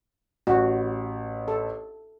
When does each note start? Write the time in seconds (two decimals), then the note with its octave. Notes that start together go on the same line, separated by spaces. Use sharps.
0.47 A1 F#4
1.48 A4